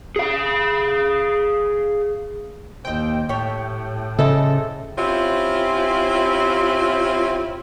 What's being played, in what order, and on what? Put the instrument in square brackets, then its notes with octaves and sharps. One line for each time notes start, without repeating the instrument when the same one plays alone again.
[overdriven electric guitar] G#4 F5
[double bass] D#2 [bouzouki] C5 D#5 [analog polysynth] G5
[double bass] A2 [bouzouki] G4 C#5 A5
[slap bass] C#3 [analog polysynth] A4 [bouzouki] C5 D#5 E5
[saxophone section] C4 C#4 E4 F4 G4